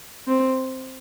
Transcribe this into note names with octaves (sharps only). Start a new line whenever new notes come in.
C4